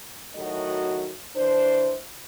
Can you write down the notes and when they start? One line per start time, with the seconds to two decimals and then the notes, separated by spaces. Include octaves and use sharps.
0.35 A2 D#3 F#3 F#4 D#5
1.36 E3 D4 C5